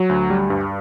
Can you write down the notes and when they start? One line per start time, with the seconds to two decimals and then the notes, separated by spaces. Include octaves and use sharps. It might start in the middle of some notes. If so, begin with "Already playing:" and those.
Already playing: F#3
0.09 D2
0.30 G3
0.50 G2